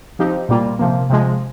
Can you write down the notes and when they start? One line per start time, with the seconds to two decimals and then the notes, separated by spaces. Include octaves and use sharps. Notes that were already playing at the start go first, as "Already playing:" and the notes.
0.19 F3 C4 D#4 G4
0.49 A#2 G3 A#3 F4
0.79 C3 F3 A#3
1.10 C3 F3 G#3